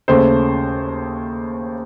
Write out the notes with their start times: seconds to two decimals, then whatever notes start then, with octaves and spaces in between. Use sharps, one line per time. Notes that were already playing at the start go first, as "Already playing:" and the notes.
0.08 D#2 C#3 A3 C5